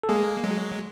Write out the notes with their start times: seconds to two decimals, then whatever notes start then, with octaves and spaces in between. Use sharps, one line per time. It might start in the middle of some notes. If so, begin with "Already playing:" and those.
0.03 A4
0.09 G#3 A#3 G#4
0.44 F#3 G#3